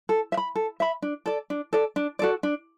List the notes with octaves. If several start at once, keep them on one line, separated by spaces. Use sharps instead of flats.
A4
E5
B5
A4
E5 B5
D4
A4 D5
D4
A4 D5
D4
F#4 A4 D5
D4